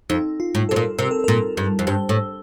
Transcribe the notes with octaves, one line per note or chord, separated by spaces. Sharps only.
F2 D#4
F4
A2
C3 A4
A#2
C3 A#4
A4
A#2 A#4
G2
F2
G2 C5
A2